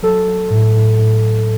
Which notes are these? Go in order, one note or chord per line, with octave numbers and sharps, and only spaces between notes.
F#3 A4
F#3
A2
A2
A2